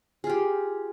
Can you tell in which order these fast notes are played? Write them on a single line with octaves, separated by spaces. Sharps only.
G#4 F4 G4